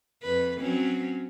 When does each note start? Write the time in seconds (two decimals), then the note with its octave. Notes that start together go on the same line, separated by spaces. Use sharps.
0.23 F2 B4
0.61 F#3 C4 C#4